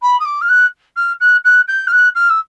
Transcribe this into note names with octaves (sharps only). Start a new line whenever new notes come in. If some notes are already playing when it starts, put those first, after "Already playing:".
B5
D#6
D6
F6
F#6
F6
F#6
F#6
G6
F6
F#6
F6
E6